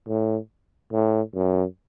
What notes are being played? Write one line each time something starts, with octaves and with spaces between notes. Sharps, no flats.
A2
A2
F#2